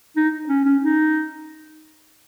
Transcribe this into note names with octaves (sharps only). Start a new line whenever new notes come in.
D#4
C#4
C#4
D#4